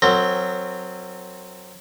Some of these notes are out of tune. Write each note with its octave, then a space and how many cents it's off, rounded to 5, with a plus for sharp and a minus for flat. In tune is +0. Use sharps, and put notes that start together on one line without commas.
F#3 -5 C4 +0 A#4 -35